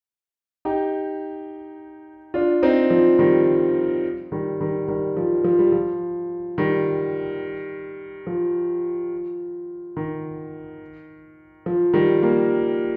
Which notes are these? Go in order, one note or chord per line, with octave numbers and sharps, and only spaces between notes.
D#4 G4
D4 F4
C4 D#4
F3
D#3 G3
D#3 G3
D#3 G3
D#3 G3
F3
F3
G3
F3
D#3 G3
F3
D#3
F3
D#3 G3
G3 A#3